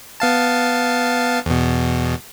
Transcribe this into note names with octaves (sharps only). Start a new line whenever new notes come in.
B3 F5 A5
E2 B2